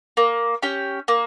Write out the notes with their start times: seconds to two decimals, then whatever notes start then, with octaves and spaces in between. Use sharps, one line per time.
0.17 A#3
0.62 C#4 G4
1.08 A#3